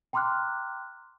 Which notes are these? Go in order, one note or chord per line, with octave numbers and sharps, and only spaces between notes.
G5 A#5 C6 D6 F6 F#6